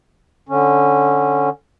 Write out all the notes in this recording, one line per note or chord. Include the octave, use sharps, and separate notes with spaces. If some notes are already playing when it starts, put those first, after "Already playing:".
D3 C#4